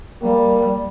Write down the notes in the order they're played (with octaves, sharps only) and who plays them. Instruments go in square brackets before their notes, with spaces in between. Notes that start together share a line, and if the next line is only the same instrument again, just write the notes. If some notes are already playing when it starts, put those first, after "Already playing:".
[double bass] G3 [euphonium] A#3